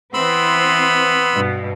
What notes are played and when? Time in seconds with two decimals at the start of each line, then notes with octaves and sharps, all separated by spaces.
0.14 E3 B3 C4 C5 B5 C6 E6
1.34 G2 B2